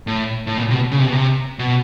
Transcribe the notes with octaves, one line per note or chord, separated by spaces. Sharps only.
A2
A2
A#2
C3
B2
C#3
C3
B2
C3
B2